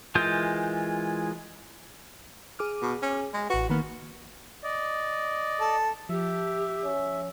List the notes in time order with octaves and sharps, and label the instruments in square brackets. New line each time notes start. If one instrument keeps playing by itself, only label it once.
[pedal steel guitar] E3 G#3 F4 A#4 G6
[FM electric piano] G#4 D6 F6
[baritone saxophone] B2
C#4
G#3
[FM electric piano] A1 B4 [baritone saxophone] F#4
[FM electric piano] D#3 A#3 [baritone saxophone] B3
[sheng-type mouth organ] D5 D#5
[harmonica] A4
[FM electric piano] F3 [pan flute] G4 [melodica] E5
[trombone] C#4